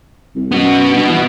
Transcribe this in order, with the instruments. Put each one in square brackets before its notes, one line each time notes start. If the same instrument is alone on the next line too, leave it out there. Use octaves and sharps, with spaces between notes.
[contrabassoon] C2
[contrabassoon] F#2 [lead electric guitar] B3 F#4
[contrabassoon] G2
E3